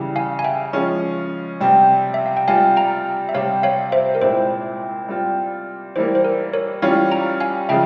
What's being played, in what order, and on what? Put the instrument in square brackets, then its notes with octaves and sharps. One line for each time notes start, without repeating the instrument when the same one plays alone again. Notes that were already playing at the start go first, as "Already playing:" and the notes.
Already playing: [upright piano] C#3 E3 G3
[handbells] F5 G#5
G#5
E5 G5
[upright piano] F3 G#3 C#4 F4
C3 G3 C4
[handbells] E5
F5
G5
[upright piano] G3 C4 F4 [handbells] F5 G#5
[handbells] G5 A#5
E5
[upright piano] C3 G3 C4 [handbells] C#5 F5
[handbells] C#5 F5
C5 E5
A#4
[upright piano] A#2 G#3 C4 E4 [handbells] C5
[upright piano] G3 C4 F4
[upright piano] E3 G3 A#3 [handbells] C5
[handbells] C5
A#4
A#4 C#5
[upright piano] E3 G3 C#4 F4 [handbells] C#5 F5
[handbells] G5 A#5
F5 G#5
[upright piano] C#3 F3 G#3 [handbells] E5 G5